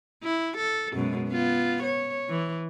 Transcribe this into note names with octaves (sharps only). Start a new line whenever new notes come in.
E4
A4
F#2 B2 G#3
B3 F4
C#5
E3